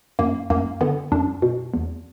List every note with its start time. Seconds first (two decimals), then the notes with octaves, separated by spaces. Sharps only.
0.19 F#2 A#3
0.50 F#2 A#3
0.81 D3 B3
1.12 F#2 D4
1.42 B2
1.74 E2